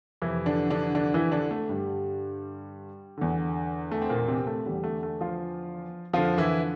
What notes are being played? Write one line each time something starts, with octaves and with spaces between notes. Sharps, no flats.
F2 C3 E3 E4
D3 D4
D3 D4
D3 D4
E3 E4
D3 D4
A3
G2 D3 G3
E2 D3
A3
C4
A#2 A#3
C3 C4
A3
E2 D3 G3
A3
A3
F3 F4
F2 D3 F3 F4
E3 E4